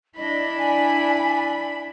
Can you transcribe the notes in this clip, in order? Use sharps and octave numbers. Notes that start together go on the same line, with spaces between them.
D4 E4 D#5 B5
G#5